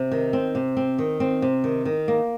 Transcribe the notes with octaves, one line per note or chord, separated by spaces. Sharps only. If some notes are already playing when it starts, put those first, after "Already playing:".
Already playing: C3
D#3
C4
C3
C4
D#3
C4
C3
D#3
D#3
A#3